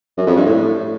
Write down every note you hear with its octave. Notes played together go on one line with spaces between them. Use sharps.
F#2
F2
G2
A2